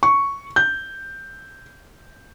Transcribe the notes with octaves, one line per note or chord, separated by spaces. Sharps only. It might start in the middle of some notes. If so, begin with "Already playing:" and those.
C#6
G6